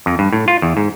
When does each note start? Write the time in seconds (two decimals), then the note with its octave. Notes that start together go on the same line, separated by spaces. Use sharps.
0.06 F2
0.19 G2
0.33 A2
0.48 F4
0.62 E2
0.77 G#2